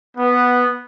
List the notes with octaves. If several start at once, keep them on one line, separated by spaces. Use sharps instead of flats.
B3